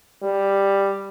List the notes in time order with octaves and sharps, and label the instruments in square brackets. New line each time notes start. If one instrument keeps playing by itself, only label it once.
[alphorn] G3